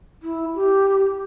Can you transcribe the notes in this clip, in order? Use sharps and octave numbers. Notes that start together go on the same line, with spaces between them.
E4
G4